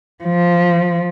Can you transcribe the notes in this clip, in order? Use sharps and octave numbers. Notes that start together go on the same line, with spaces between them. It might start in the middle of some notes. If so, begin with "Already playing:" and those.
F3